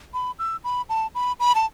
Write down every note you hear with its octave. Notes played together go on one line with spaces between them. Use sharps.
B5
E6
B5
A5
B5
B5
A5